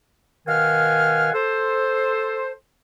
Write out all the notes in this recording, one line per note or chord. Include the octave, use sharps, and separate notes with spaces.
B2 D#3 F5 F#5 G#5 F6
A4 C5